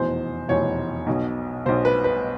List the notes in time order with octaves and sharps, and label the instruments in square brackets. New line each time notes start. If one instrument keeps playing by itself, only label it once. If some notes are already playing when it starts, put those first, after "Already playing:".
Already playing: [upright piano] F1 E2 B2 C5
F1 E2 B2 C#5
B1 B2
B2 C5
B1
B4
B4